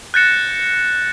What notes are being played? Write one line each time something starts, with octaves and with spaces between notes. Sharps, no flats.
F#6 G6 A6 A#6 C#7 E7